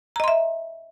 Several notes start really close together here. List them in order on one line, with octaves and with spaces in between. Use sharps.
A#5 D#5 C6 E5